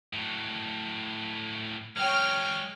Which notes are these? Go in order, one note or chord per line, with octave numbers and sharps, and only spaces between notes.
A2 F#3
F#3 G#3 C#5 G5 F6